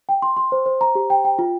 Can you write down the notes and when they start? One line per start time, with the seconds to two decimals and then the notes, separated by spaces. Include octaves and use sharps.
0.09 G5
0.22 C6
0.37 C6
0.52 C5
0.66 C5
0.81 A#5
0.95 G4
1.10 G5
1.25 G5
1.39 F4